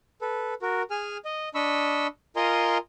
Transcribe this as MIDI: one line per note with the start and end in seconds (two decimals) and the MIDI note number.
0.21 0.54 69
0.21 0.54 71
0.62 0.83 66
0.62 0.83 70
0.91 1.17 68
0.91 1.17 80
0.91 1.17 89
1.25 1.49 75
1.55 2.07 62
1.55 2.07 75
1.55 2.07 83
1.55 2.07 85
1.55 2.07 88
2.36 2.78 65
2.36 2.78 70
2.36 2.78 75
2.36 2.78 80
2.36 2.78 82
2.36 2.78 84